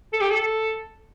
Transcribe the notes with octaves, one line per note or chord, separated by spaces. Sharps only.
A4
G4
A4